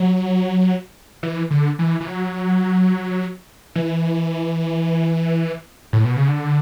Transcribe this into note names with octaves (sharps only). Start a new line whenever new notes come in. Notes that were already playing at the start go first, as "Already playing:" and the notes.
Already playing: F#3
E3
D3
E3
E3
F#3
E3
A2
B2
C#3
D3